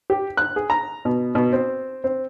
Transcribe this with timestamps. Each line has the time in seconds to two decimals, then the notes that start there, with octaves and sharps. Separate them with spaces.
0.10 G4
0.37 F#6
0.56 G#4
0.70 A#5
1.05 B2
1.35 B2
1.53 C4
2.04 C4